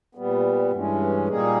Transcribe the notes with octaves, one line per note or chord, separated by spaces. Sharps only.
A#2 G3 B3
G2 E3 G#3 C#4
A#2 G3 A#3 D#4 G#4